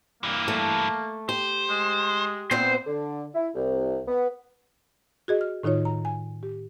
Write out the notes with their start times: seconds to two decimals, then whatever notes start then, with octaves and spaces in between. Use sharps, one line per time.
0.23 G2 E3 A#3
0.48 A3
1.29 G4 C5
1.70 G#3
2.51 A#2 B3 C4 C5
2.87 D3
3.35 E4
3.55 C2
4.08 B3
5.28 F#4 G#4 D#5
5.41 F6
5.63 A2 D#3 D#4 F4 C#5
5.85 A#5
6.05 G#5
6.43 G4